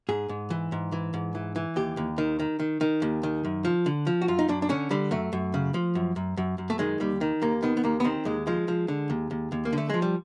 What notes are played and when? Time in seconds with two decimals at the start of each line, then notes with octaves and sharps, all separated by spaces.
0.09 G#2 G#4
0.29 G#2
0.50 E3
0.72 G#2
0.92 E3
1.14 G#2
1.35 E3
1.56 E3
1.76 D#2 G4
1.97 D#2
2.18 D#3
2.40 D#3
2.60 D#3
2.81 D#3
3.02 D#2
3.23 D#3
3.45 F#2
3.65 F3
3.86 D3
4.07 F3
4.21 F#4
4.28 F#2 F4
4.39 D#4
4.49 F#2 D4
4.62 D4
4.69 D3 C#4
4.91 D3 G3
5.11 F#2 A3
5.33 F#2
5.54 C#3
5.74 F3
5.95 F#2
6.16 F#2
6.37 F#2
6.58 F#2
6.70 A3
6.79 D#3 G#3
7.00 D#2 G3
7.21 D#3
7.42 D#2 A#3
7.63 D#3 B3
7.77 B3
7.84 D#2 A#3
8.00 B3
8.04 D#3 C4
8.25 D#2 G#3
8.47 F3 G#3
8.68 F3
8.88 D3
9.10 D#2
9.31 D#2
9.52 D#2
9.65 A#3
9.73 D3
9.78 A3
9.90 F3 G#3
10.02 G3